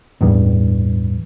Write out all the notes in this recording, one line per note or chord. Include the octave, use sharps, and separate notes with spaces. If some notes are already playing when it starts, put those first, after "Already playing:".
A1 E2 G2